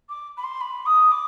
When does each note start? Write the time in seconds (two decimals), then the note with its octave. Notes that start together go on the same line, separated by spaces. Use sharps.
0.09 D6
0.37 B5
0.43 C6
0.61 B5
0.86 D#6
1.12 D6